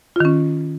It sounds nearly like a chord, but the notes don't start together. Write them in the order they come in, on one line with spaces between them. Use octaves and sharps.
F4 D#3 C#4